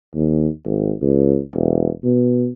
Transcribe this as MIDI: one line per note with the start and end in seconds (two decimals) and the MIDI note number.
0.15 0.48 39
0.65 0.93 32
1.02 1.39 37
1.54 1.89 28
2.03 2.48 47